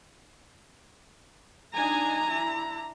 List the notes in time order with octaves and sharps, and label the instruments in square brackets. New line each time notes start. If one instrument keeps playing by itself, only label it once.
[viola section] D4 D#4 G#5 [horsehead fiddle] A#5
[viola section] D4 E4